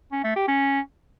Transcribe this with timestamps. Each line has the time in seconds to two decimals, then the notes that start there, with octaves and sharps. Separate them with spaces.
0.12 C#4
0.24 A3
0.36 G4
0.48 C#4